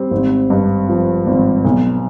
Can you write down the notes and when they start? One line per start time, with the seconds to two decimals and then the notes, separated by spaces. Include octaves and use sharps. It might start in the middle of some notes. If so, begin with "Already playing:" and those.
Already playing: G3 C4
0.11 G#1
0.50 G2
0.88 F3
1.27 G#1
1.64 B1